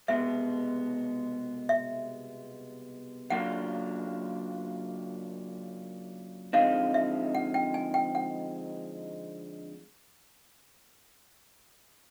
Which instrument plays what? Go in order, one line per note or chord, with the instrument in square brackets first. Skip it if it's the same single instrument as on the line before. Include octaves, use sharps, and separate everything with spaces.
[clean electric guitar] C2 B2 G#3 B3 [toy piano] E5
[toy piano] E5
[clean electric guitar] C#3 F#3 A#3 D4 F4 [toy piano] F#5
[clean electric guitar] D3 F3 G#3 C4 D#4 [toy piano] F5
[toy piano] E5
F#5
G5
G#5
G5
F#5